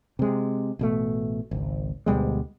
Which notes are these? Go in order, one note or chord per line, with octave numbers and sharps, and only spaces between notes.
C3 G#3
A1 B2 A3
G#1 C#2
D2 B2 G3 G#3